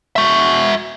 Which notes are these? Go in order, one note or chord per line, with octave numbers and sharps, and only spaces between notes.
F#4 E5